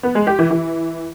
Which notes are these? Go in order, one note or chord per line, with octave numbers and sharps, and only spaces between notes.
B3
G#3
G4
E3
E3